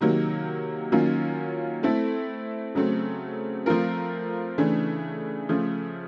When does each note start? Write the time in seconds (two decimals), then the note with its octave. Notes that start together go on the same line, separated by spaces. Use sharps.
0.01 C3 D#3 F#3 A#3
0.92 D#3 F#3 A#3 C#4 F4
1.83 A3 C4 E4 A4
2.75 C#3 F#3 A3 C4
3.66 F3 A3 C4 F4 A#4
4.58 C#3 E3 A3 D4
5.49 C#3 F3 A3